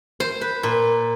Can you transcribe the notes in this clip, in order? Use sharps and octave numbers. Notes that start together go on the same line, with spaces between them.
C5
B4
A#2